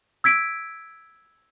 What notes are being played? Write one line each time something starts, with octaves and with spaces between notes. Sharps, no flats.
E6 G#6 B6 D7